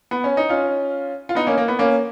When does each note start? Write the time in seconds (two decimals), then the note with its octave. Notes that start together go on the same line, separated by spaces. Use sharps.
0.11 B3
0.24 C#4
0.37 D#4
0.49 C#4 F4
1.29 F4
1.35 B3 D#4
1.47 A#3 C#4
1.58 A#3
1.68 B3
1.79 A#3 C#4